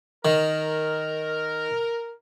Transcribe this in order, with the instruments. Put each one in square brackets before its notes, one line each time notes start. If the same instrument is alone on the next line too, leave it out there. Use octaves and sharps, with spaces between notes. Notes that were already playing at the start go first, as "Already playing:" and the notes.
[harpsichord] D#3 [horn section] A#4